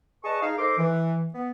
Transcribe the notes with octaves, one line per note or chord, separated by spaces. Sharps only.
G#4 B4 D5 D#5 A5 C#6
D#4 G#4 F5
D#4 A4 A#4 C5 C6 D6
E3
B3